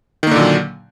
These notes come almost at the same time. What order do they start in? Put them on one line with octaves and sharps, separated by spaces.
D#3 A#3 D3 A#2 F#3